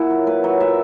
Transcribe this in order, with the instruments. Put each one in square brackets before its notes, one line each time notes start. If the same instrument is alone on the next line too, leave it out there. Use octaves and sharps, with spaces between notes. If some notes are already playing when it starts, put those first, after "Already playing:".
Already playing: [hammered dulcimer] A#2 E4 F#4
F#3
A#2 B4
F#3 C#5
A#2 E5